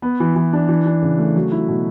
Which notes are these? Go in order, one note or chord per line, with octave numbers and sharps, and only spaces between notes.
B3
E3
E3
D4
E3
D4
C#3
A3
F#3
E4
B2